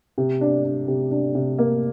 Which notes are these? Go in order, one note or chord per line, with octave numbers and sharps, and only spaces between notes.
C3
D4
D4
C3
D4
C3
A#3